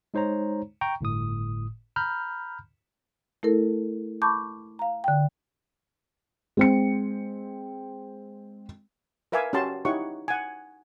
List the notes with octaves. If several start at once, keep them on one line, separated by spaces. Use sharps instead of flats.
G#3 D#4 C5 C#5 A#5
G5 A#5 C#6
G1 A2 D#6
A#5 B5 F6 G6
A3 E4 A4 A#4
A5 B5 C#6 D6 G6
F5 A#5
D3 G5
G#3 C4 C#7
A#4 B4 E5 F5 G#5 D6
C#4 F#4 G4 A5 C6
D#4 E4 G4 C#5 F#5 C#6
F#5 G#5